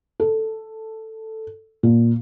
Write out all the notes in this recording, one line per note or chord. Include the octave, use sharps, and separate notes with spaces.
A4
A#2